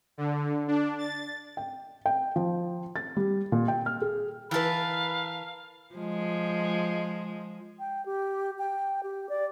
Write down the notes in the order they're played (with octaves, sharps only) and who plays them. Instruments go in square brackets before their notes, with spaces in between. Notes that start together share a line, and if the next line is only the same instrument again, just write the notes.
[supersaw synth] D3
D4
A6
[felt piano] G5
G5
F3
A6
G3
A#2
G5
F6
G#4
[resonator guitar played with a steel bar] E3 B4 [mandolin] A#4 A5 [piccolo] F5 [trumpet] B5
[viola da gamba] F3 G#3
[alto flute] G5
G4
G5
G4
D5